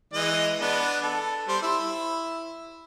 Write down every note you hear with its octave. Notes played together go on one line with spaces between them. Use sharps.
E3 G#3 D#5
B3 D4
A4
G3 C5
E4